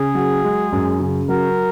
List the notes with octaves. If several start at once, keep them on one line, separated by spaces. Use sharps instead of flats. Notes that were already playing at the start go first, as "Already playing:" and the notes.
Already playing: C#3 G#4
F#3
G#3
F#2
C#3
F#3 A#4